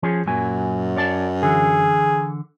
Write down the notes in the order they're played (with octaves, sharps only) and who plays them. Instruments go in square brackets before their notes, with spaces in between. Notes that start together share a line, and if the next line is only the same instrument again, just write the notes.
[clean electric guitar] F3 C#4 G#4
[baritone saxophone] F#2 [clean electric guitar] A#2 F#3 G#5
[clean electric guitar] C#5 D5 A5
[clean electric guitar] D3 E3 [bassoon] G#4